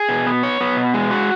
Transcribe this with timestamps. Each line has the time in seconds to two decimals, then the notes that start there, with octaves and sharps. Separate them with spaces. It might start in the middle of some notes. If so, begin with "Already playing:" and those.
Already playing: G#4
0.09 B2
0.26 B3
0.43 C#5
0.61 B3
0.77 B2
0.94 G#3
1.11 F#4